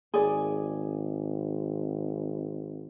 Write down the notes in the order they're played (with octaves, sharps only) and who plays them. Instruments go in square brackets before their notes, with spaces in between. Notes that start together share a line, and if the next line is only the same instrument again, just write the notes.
[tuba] G#1 [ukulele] G#4 D5